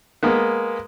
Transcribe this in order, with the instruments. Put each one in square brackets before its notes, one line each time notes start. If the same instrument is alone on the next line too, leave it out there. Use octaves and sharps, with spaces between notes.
[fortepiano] G#3 A#3 B3